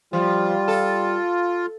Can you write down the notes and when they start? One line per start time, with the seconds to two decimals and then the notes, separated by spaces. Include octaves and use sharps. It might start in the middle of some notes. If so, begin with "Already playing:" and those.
0.13 F3 G3 F4
0.68 A4